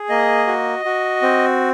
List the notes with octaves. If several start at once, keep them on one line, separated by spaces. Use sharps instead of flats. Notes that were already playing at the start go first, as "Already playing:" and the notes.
Already playing: G#4
A#3 D#5
F#4
F#4
C4